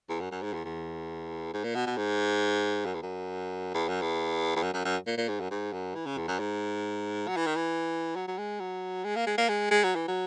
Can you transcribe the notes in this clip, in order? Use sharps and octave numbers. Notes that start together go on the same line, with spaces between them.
E2
F#2
F#2
G#2
E2
E2
G#2
A#2
B2
B2
G#2
F#2
E2
F#2
E2
F#2
E2
E2
F#2
F#2
F#2
A#2
A#2
G#2
F#2
G#2
F#2
E3
C#3
E2
F#2
G#2
F#3
E3
D#3
E3
F#3
F#3
G#3
F#3
G#3
A#3
G#3
A#3
G#3
G#3
F#3
E3
F#3